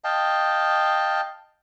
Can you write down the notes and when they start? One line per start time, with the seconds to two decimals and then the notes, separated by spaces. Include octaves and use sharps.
0.04 D#5 F5 G5 A5